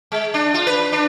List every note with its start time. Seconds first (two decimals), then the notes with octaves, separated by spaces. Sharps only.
0.12 G#3
0.34 D4
0.54 F4
0.67 B4
0.92 D4